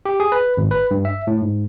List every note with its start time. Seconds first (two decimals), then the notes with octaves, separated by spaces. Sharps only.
0.05 G4
0.20 G#4
0.32 B4
0.57 G#1
0.71 B4
0.91 G2
1.05 E5
1.27 A2
1.42 G#2